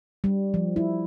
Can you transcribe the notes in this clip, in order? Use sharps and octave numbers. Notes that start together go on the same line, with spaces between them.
G3
F3
E4